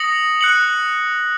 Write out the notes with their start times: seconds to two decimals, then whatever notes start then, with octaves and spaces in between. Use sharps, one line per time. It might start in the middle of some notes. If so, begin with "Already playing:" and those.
Already playing: D#6 A#6 C#7 F#7
0.41 F#6 C#7 F#7